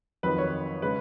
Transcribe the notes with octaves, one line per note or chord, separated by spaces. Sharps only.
F2 D#3 F#3 B4
C#5
C#3 G#3 B4